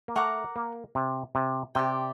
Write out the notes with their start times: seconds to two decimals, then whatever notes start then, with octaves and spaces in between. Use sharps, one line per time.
0.08 A#3
0.16 A3 A#4 F#5 A#5 D6
0.56 A#3
0.95 C3
1.35 C3
1.75 C3 G4 D5 G5